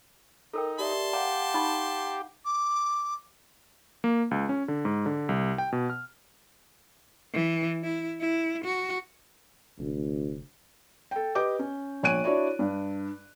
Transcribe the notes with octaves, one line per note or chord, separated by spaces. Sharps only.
D#4 A4 A#4 G5
G4 D5 E5 A5 C6
G4 F5 F#5 A#5
D#4 B5 C#6
D6
A#3
C#2
C#4
D3
G#2
D3
C2
G5
B2
F6
E3
E4
E4
F#4
F1 D2
A4 G5
G4 B4 D#5 D6 G6
C#4
A#1 C#5 G#5 F#6 D7 D#7
D4 E4 F#4 C#5 D5
G2